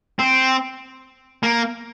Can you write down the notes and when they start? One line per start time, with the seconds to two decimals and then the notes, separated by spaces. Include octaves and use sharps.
0.19 C4
1.43 A#3